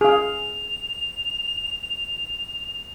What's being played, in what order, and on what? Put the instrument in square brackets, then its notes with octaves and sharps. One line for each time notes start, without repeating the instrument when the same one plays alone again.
[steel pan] G#4 F5 [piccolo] F7